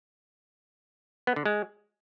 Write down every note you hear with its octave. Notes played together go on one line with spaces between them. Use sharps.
B3
D3
G#3